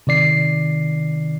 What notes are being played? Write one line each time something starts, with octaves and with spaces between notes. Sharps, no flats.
C3 D#3 D5 C7